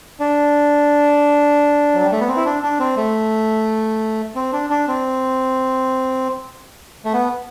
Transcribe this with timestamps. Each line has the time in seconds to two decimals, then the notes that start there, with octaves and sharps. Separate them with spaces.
0.20 D4
1.95 F#3
2.03 G3
2.12 A3
2.20 B3
2.28 C4
2.36 E4
2.45 D4
2.63 D4
2.79 C4
2.97 A3
4.35 C4
4.53 D4
4.70 D4
4.88 C4
7.05 A3
7.13 B3